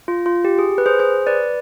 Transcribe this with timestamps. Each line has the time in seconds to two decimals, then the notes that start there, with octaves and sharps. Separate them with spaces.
0.08 F4
0.26 F4
0.45 G4
0.59 G#4
0.78 B4
0.86 G#4 C5
0.99 G#4 C5
1.27 B4 D5